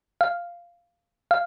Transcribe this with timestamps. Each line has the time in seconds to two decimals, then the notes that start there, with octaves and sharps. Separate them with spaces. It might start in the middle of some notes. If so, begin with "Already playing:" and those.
0.21 F5
1.31 F5